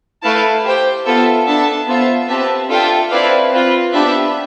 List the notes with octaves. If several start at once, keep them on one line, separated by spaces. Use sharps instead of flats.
A3 E4 B4 F5 A5
G4 C5 G5
B3 F4 A4 E5
B3 D4 A4 E5 A5
B3 F4 C5 E5
C4 G4 B4 E5 A5
D4 F4 A4 E5 G5
C4 E4 B4 D5 F5
C4 F4 B4
B3 D4 G4 B4 E5